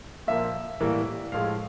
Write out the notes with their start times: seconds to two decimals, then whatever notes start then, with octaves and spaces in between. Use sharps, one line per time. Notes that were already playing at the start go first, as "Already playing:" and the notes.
0.27 A#2 F3 A#3 E5
0.80 A2 E3 G3 A#3
1.32 A2 F3 G#3 F5